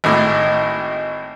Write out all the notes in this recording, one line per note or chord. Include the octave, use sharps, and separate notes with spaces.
G#1 A2